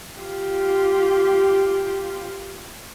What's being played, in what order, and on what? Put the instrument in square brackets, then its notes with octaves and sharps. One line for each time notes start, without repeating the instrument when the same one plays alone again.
[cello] F4 G4